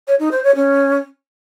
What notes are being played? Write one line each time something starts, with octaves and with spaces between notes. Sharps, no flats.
C#5
D#4
C5
C#5
C#4